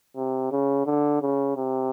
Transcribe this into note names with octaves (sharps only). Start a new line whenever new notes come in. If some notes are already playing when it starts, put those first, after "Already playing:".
C3
C#3
D3
C#3
C3